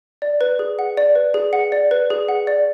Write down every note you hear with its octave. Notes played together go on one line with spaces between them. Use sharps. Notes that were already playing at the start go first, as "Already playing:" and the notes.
D5
B4
G#4
F#5
D5
B4
G#4
F#5
D5
B4
G#4
F#5
D5